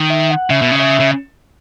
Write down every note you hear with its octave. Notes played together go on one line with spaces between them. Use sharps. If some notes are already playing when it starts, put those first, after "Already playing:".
Already playing: D#3
E5
F#5
C#3 E5
B2
C#3
E5
C#3